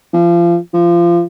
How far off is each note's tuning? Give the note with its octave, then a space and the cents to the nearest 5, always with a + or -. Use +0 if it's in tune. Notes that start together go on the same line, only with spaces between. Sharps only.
F3 -30
F3 -25